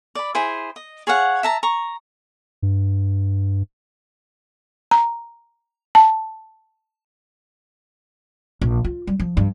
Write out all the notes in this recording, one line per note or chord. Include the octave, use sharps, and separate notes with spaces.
D5 B5
E4 G#4 C5 G#5
D#5
G#4 C#5 F5 F#5
E5 A5 A#5
A#5 C#6
G2
A#5
A5
A#1
F4
G3
F3
G2